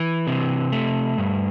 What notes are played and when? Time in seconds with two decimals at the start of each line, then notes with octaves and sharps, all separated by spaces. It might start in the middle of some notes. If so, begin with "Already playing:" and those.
Already playing: E3
0.27 C3
0.72 A3
1.18 G2